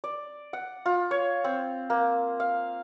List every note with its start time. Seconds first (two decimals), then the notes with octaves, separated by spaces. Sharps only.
0.04 D5
0.53 F#5
0.86 F4
1.11 C#5
1.44 C4
1.90 A#3
2.40 F5